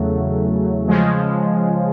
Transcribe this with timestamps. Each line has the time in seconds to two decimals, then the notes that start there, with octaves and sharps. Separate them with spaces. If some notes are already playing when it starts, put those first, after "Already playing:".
Already playing: E2 C#3 F#3 A3
0.87 C#3 F3 G#3